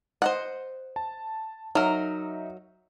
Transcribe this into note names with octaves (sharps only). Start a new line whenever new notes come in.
C5 D#5 F#5
A5
F#3 D#4 A#4 E5